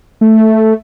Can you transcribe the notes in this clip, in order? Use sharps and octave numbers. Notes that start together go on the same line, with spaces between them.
A3